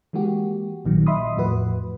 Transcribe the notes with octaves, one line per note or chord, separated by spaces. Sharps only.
E3 G#3 A#3 F#4 G4
A#1 A#2 D#3 F#3
D#5 E5 B5 C6 D#6
E2 A2 F3 F#4 B4